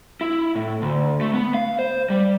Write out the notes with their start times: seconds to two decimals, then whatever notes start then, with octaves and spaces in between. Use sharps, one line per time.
0.21 E4
0.56 A2
0.82 D2
1.21 A3
1.34 B3
1.54 F5
1.79 C5
2.10 G3